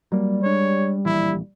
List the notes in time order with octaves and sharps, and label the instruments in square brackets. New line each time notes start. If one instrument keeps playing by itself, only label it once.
[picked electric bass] F#3 A#3 [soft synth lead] G3
[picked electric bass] G#3 D4 [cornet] C#5
[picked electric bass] D1 A#1 E3 [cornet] E4